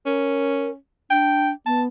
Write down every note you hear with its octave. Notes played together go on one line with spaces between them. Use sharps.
C#4 A#4
D4 G5
B3 A5